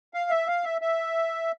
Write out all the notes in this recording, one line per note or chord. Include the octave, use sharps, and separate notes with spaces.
F5
E5
F5
E5
E5